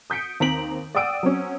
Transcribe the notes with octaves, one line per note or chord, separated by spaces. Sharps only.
D#6 G6 B6 C#7 D7
D#2 C4 A#5 B6 D7 F#7
D5 F#5 G5 D#6 E6 D7
F#3 C4 C#4